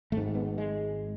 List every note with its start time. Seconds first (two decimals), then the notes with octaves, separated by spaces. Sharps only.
0.12 G#1 A3
0.17 G#2
0.35 B3
0.58 G#3